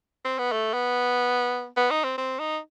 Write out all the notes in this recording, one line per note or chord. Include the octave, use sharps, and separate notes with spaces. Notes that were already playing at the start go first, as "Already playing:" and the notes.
C4
B3
A3
B3
B3
D#4
C4
C4
D#4